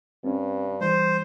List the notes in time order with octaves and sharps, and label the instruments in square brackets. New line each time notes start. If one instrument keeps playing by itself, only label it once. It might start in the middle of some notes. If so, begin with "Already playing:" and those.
[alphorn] G2 [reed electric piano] C4 C#4
[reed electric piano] E3 G3 [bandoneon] C5